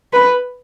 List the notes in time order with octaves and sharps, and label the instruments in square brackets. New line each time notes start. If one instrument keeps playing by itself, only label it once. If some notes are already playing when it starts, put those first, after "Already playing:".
[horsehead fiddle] B4